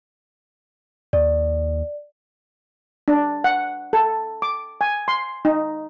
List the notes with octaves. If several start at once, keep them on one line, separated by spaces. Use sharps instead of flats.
D#2 D5
D4
F#5
A4
D6
G#5
C6
D#4